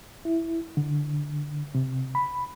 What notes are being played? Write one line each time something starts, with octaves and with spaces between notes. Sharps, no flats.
E4
D3
C3
B5